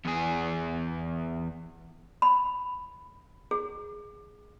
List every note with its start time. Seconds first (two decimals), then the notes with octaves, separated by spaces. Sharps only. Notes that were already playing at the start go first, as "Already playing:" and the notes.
0.05 E2 G#4
2.22 B5
3.51 G#4